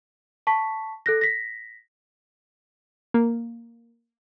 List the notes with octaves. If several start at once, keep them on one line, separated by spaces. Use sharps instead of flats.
A5 C#6 B6
A4 F#6 A#6
A#6 B6
A#3